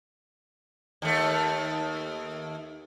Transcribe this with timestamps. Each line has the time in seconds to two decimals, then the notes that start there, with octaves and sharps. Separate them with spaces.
1.02 D#2 A3